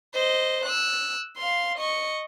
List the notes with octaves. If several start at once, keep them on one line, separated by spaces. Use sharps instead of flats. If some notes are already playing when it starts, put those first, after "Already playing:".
C5 D#5
E6 F#6
F5 C6
D#5 C#6